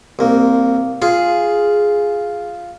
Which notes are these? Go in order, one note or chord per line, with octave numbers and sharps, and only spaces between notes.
C2 A#3
F4 G#4